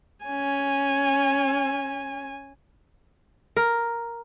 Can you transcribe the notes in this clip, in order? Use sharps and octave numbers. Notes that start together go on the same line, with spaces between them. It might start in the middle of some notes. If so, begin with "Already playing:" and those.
C#4 G#5
A#4